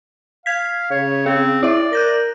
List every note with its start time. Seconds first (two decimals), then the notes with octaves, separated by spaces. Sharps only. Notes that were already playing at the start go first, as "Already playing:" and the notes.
0.46 F5 G#6 B6
0.91 C#3 C#5
1.26 C4 G#4
1.63 E4 D5 E5
1.93 A#4 F#6 G6 A#6